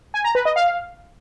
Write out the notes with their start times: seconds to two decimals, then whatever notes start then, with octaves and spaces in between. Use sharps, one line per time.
0.14 G#5
0.24 A#5
0.35 B4
0.45 D#5
0.56 F5